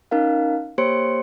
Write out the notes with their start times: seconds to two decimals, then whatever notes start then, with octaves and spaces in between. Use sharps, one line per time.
0.11 C#4 D#4 A#4 F5
0.78 A#3 G4 C5 C#5 C6 C#7